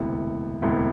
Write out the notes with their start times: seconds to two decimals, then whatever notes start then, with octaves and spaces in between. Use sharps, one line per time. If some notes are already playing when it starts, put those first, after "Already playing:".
Already playing: E1 D2 C3 E3 B3
0.62 E1 D2 C3 E3 B3